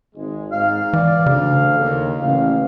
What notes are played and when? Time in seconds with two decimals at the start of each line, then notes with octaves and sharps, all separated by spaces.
0.15 G#1 G#3
0.52 G#2 F5
0.93 E3 D5
1.26 D2 C#3
1.78 D#2
2.21 A1 F5